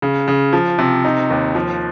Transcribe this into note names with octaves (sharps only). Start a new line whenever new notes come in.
C#3
C#3
F3
C3
D#4
D#2
F3